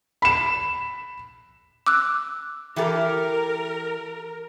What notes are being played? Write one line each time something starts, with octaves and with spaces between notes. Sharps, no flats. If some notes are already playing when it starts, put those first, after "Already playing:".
B5 E7
D6 E6 F#6
E3 G4 A4 A#4